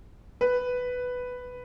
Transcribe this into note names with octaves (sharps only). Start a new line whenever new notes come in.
B4